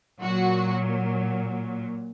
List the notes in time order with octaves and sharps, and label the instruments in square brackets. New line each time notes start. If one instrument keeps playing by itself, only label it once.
[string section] A#2 F#3 F#4